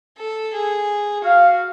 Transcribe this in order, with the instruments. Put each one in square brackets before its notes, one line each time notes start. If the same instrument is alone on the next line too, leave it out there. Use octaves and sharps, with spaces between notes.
[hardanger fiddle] A4
G#4
[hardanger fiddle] F#4 [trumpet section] F5